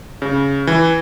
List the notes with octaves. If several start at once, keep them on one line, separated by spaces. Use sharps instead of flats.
C#3
E3